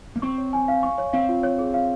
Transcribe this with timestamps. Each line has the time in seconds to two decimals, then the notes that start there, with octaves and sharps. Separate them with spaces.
0.16 A#3
0.22 C4 C#6
0.38 C#5
0.53 G#5
0.68 F5
0.83 C#6
0.98 C#5
1.13 C4 F5
1.29 F4
1.43 C#5
1.58 G#4
1.74 F5